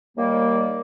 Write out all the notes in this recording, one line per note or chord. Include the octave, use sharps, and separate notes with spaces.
D#2 D#3 G3 A#3